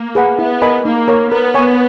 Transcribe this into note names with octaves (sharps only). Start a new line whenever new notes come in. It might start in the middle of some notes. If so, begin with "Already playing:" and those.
Already playing: A#3
G#4 B4 F#5 B5
B3 E4
A#4 D#5 G#5 B5
A#3 D#4
A#4 C#5
B3 A#4
C#5 G#5 C#6